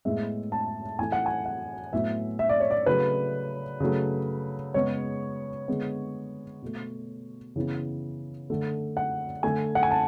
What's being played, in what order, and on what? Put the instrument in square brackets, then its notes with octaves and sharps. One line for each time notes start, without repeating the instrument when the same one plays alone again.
[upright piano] A2 G#3 B3 E5
A5
A2 E3 A3 G#5
F#5
G#5
F#5
A2 F#3 B3 E5
E5
D5
C#5
D5
C#3 F#3 A3 B4
C#3 F#3 A3
C#3 G#3 B3 C#5
D3 G#3 B3
B2 A3
C#3 E3 B3
D3 A3
F#5
D3 A3 G#5
F#5
G#5
A5